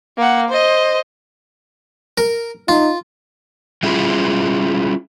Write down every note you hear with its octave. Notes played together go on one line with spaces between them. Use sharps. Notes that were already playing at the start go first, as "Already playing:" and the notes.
A#3 F#5
C5 D#5
A#4
D#4 F4
G3 C#4 E4 F4 G#4